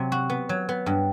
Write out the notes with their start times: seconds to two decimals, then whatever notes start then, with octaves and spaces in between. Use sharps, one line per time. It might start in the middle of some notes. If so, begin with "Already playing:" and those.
Already playing: C3 F#3
0.12 F#4
0.30 B3
0.49 F#3
0.69 B3
0.86 G2